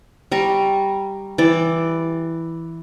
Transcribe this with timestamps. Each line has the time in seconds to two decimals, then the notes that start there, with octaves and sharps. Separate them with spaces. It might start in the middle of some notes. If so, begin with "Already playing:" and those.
0.32 G3 A#5 C#6
1.38 E3 D5